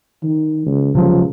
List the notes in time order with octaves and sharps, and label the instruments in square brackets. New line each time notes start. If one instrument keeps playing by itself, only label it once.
[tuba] D#3
C#2
[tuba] C#2 [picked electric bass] C3 F#3 [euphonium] F3